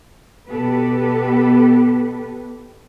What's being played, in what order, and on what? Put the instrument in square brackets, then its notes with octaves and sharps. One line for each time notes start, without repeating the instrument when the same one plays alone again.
[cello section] B2 B3 G4 A4 B4